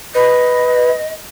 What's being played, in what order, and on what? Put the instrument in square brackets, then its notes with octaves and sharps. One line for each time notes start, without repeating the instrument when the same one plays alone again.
[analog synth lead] B4 [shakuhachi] D#5